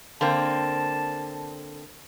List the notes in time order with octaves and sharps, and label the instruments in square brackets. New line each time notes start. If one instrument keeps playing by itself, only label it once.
[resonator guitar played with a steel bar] D3 A#3 C4 [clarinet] A5